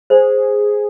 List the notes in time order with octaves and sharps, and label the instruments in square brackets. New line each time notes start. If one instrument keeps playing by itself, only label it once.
[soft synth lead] G#4 [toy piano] C5